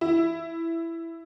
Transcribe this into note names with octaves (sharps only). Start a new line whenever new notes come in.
E4